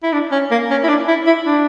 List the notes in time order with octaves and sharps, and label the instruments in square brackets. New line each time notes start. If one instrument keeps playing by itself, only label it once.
[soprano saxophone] E4
D4
C#4
A#3
C#4
E4
D4
E4
E4
D4